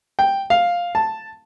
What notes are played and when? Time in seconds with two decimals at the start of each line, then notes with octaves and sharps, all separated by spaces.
0.19 G5
0.50 F5
0.95 A5